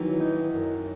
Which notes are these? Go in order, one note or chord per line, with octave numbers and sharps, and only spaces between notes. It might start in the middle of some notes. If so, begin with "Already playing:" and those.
Already playing: D#3 E3 F#3
D#4
F#2